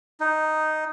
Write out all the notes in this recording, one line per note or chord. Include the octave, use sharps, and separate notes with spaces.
D#4